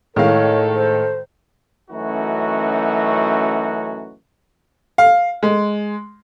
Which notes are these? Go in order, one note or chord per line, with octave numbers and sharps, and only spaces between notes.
A2 D#3 G#3 A4 C#5 F5
C5
F#2 E3 A3 C#4 D#4 F#4
F5
G#3